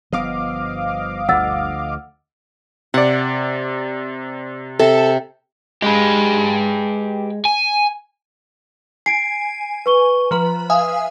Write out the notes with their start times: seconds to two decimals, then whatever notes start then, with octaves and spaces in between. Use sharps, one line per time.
0.12 G1 F3 B3 D#5 F5 D6
1.29 D2 D3 F3 F#5 E6 A6
2.94 C3 D5 F#5
4.79 C3 A4
5.82 G#3 G4 B4
7.45 G#5
9.06 G#5 C7 D7
9.86 B4 C#6 G7
10.31 F3 B4 A#5
10.70 E5 F5 G#5 D#6